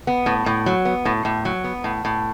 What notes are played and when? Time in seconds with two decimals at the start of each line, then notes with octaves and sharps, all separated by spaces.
0.07 B3
0.26 A2
0.46 A2
0.66 F#3
0.85 B3
1.05 A2
1.25 A2
1.45 F#3
1.64 B3
1.84 A2
2.05 A2